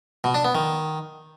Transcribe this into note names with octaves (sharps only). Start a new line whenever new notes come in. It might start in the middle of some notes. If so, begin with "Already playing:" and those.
B2
D4
B3
D#3